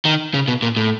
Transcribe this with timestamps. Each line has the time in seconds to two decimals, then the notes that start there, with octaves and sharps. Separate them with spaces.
0.05 D#3
0.34 C#3
0.48 B2
0.62 A#2
0.77 A2